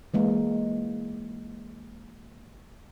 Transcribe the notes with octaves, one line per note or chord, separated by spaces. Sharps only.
E3 G#3 A#3